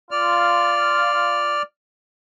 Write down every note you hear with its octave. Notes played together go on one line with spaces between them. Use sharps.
F4 D5 F6